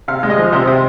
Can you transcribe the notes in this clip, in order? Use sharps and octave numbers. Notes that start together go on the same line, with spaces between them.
C3 F5
G#3
D#5
F3
C3 C5
C3